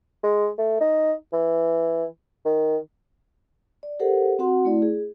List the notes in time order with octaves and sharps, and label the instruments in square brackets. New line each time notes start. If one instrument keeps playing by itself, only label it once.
[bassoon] G#3
A3
D#4
E3
D#3
[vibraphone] D5
G4 A4 A#4 C5 F#5
C4 F#4 F#5 C6
A3 E4 D5
G#4